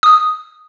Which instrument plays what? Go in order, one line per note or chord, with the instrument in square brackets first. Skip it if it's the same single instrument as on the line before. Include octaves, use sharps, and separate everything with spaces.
[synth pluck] D#6